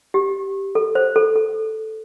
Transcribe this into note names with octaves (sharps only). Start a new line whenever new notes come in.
G4
A4
C5
A4
A4